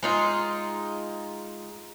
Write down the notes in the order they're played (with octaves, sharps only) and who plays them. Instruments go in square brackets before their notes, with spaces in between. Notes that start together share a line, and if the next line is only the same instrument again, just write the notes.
[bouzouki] G#3 D#4 F4